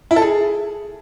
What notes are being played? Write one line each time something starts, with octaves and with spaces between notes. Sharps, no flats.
E4
A4
G#4